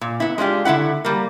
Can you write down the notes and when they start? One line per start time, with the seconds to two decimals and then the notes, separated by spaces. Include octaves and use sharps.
0.01 A#2
0.20 B3 E4
0.38 G#3 D4 F4 G4
0.65 D3 A3 E4 F#5
1.05 G3 A#3